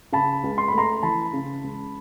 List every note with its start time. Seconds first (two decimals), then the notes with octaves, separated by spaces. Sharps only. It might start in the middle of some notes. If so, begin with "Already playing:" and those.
0.13 C#3 A5 B5
0.44 C#2
0.58 C6
0.68 A3 B5
0.78 A#5 C6
1.03 E3 A5 B5
1.33 C#3
1.64 C#2